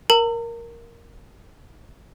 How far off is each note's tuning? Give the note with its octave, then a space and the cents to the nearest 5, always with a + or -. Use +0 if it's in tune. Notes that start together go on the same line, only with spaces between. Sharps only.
A#4 +0 A#5 -40